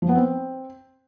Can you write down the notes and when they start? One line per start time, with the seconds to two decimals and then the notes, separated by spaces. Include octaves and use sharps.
0.02 F3
0.09 B3
0.15 C4